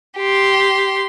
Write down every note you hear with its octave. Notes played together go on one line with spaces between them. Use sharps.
G4 C6